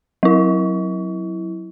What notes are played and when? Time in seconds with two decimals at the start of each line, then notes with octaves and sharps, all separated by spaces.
0.23 F#3 E4